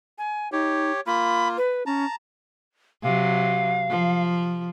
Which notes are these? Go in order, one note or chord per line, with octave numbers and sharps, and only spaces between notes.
G#5
D#4 G4 C#5
A#3 F4 B5
B4
C#4 A5 A#5
C3 F#3 F5
F3